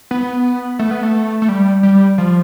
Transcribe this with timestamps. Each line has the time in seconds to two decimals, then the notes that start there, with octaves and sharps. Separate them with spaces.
0.11 B3
0.79 A3
0.91 B3
1.03 A3
1.42 A3
1.49 G3
1.83 G3
2.18 F3